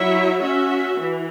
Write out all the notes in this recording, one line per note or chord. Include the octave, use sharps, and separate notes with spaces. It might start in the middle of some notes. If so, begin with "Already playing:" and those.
Already playing: F#3 E4 C#5 E5
C#4 F#4 E5
E3